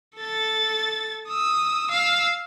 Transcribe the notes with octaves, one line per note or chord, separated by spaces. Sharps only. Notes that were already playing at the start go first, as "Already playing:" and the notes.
A4 A6
D#6 E6
F5 E6